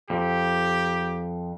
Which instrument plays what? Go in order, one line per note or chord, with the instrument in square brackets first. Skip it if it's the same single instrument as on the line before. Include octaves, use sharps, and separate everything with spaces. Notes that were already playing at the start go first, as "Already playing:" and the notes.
[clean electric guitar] F2 [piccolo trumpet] G4